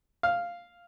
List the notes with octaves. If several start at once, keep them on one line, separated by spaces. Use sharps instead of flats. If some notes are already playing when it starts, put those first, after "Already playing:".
F5